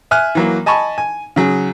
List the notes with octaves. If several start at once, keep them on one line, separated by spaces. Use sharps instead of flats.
E5 G#5 F6 F#6
E3 F#3 A#3
D#5 G#5 A5 B5 C#6
G#5
C#3 F#3 G#4